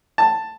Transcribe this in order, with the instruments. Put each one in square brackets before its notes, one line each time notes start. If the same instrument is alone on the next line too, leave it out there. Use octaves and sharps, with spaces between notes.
[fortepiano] A5